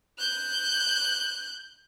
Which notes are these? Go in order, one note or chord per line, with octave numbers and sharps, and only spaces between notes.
F#6 G6